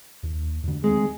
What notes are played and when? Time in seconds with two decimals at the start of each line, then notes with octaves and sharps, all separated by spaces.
0.23 D#2
0.63 E2 D3
0.84 D#3 G#3 A3 C4 G#4